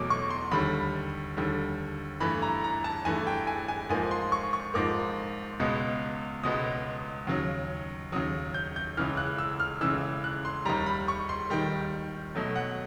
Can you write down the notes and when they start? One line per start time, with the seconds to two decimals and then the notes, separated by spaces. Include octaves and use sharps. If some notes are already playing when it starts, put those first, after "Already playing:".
Already playing: E2 B2 F#3 A3 D6
0.10 C#6
0.30 C6
0.51 D#2 D3 G3 B5
1.37 D#2 D3 G3
2.20 G2 E3 A3 B5
2.42 A#5
2.64 A#5
2.84 A5
3.05 G2 E3 A3 G#5
3.27 G5
3.47 G#5
3.68 G#5
3.89 G#2 F3 A#3 G#5
4.11 C6
4.32 C#6
4.53 C#6
4.74 G#2 F3 A#3 D6
5.60 C#2 B2 G#3 B3
6.43 C#2 B2 G#3 B3 D#6
7.27 D#2 C#3 F#3
8.12 D#2 C#3 F#3 D#6
8.54 G6
8.76 G6
8.97 C#2 C#3 E3 F6
9.17 F#6
9.38 E6
9.60 F6
9.81 C#2 C#3 E3 E6
10.24 F#6
10.45 C6
10.65 D#2 D#3 G3 A#5
10.86 B5
11.08 C#6
11.29 C6
11.50 D#2 D#3 G3 G5
12.35 B2 F#3 A3
12.56 F#5